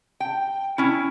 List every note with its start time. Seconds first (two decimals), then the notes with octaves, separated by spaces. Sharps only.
0.20 G5
0.78 C#4 E4